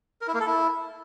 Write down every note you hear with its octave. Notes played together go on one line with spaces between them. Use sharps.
A#4
E4
A#3
A4
E4